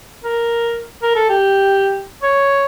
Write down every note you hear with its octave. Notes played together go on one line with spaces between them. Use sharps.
A#4
A#4
A4
G4
C#5